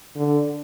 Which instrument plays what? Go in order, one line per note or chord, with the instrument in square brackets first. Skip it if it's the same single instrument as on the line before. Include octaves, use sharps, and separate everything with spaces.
[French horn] D3